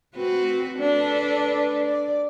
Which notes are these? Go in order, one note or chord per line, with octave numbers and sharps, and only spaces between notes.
C4 F#4 B4
D4 A4 B4
D5